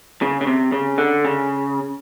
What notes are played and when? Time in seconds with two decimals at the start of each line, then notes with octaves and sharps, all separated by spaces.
0.22 C#3
0.41 C#3
0.47 C3
0.72 C#3
0.98 D3
1.25 C#3